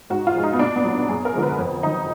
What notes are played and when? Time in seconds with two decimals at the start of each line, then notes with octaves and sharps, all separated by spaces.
0.10 G#2 F#4
0.27 F4
0.35 F3 G#3
0.43 D#4
0.53 B3
0.59 A#2 D4
0.76 B3
0.84 F#3
1.09 F#2 G#4
1.25 A#4
1.34 D3 F3 G#3
1.43 B4
1.59 F2
1.83 D#3 F#3 D#4